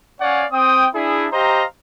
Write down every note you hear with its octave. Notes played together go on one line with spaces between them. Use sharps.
C#4 C#5 D5 F5 F#5 G#5
C4 G5 D#6
D4 E4 G#4
G4 C5 D#5 F5 A#5